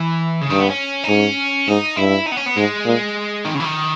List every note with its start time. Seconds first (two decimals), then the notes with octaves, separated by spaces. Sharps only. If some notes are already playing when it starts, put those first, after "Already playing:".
Already playing: E3
0.41 C#3
0.50 G2 D#3
0.60 B3
0.69 C#4
1.03 D#4
1.08 G#2 C#4
1.68 G#2 D#4
1.97 G2 E4
2.27 D#4
2.32 B3
2.37 C#4
2.46 B3
2.56 G#2 G#3
2.86 A#2
3.45 D#3
3.55 C#3
3.60 E3
3.64 D#3